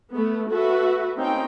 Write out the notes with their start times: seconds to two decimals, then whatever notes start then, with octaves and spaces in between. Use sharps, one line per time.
0.11 A3 B3
0.50 F#4 A4 B4 E5
1.17 A#3 C4 C#4 D#4 G5